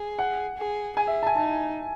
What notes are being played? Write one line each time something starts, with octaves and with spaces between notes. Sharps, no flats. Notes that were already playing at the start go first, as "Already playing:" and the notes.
Already playing: G#4
F#5
G#4
G#4 G#5
E5
A5
G#5
D#4 A5